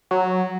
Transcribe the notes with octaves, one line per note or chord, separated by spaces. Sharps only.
F#3